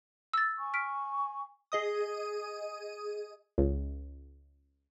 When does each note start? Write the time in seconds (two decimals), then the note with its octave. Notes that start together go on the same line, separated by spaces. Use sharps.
0.33 E6 A6
0.58 G#5 C#6
0.74 F6 B6 D7
1.72 G#4 D#5 D#6
3.58 C#2